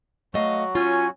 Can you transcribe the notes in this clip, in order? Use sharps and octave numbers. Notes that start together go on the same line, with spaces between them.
F#3 A3 F#4 D#5 F5
C#4 F4 G#5